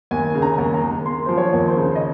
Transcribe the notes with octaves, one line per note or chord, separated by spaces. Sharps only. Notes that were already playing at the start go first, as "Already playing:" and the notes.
D#2 G#5
C#3
A#5
D#2
A#5
D#2
A#3 C6
F3 C5
C#5
D#2
C5
C#3
D#5